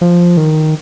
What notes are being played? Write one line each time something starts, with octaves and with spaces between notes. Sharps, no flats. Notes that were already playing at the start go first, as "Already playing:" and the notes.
F3
D#3